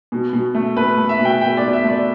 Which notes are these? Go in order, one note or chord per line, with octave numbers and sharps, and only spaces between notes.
B2
B2
A3
A3 B4
A3
E5
B2
G5
B2 G5
B2 D5
E5
A3 D5